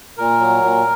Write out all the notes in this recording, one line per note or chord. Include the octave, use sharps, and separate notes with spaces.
A#2 A#4
F#3
A#2